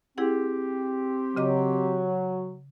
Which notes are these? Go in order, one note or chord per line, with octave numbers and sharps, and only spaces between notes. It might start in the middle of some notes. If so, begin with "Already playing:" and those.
C4 E4 G4 G#4 F#5
C#3 F#3 D#5 D6